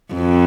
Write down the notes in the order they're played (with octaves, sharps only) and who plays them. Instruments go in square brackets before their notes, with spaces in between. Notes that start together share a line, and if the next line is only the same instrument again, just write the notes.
[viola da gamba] F2